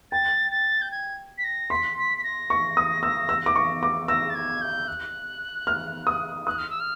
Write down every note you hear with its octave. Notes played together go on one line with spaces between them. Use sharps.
G5 A6
A6
G6
G#6
B6
A#6
C6 B6
B6
B6
A#6
C#6
D#6
E6
E6
D6
C#6
D6
E6 A#6
A6
G#6
G6
F#6
F6
D#6
D#6 F#6
F6
E6
F6